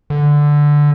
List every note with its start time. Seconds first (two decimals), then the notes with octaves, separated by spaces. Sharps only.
0.10 D3